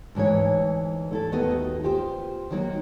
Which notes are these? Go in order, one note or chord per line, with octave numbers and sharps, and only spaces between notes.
D2 G#2 E3 C#5
A3 E4 A4
D#2 D#3 A3 B3 F#4 D#5
F4 G4 C5
D#3 F#3 A#3